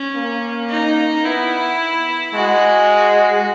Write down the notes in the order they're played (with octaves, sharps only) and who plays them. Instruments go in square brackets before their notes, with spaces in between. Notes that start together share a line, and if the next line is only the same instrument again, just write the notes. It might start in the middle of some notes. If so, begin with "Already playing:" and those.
Already playing: [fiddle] C#4
[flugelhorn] A#3
[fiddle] D#4
[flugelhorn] B3 [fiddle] E4
[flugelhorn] G#3 [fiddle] F#4